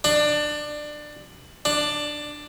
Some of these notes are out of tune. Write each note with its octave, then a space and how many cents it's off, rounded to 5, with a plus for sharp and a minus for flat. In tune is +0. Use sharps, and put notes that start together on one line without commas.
D4 +20
D4 +10